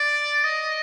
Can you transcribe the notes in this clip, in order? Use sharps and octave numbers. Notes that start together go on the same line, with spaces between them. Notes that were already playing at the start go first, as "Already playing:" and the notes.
Already playing: D5
D#5